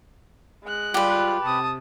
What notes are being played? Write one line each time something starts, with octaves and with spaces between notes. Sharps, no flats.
G#3 F#6
G3 F4 G4 B4
C3 A5 D#6